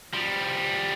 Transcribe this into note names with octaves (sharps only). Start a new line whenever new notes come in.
F3 G3